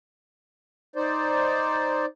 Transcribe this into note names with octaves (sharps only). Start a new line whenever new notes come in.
D#4 C5 D5